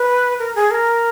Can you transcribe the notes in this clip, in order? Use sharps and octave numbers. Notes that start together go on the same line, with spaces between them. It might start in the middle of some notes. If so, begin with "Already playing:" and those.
Already playing: B4
A#4
G#4
A#4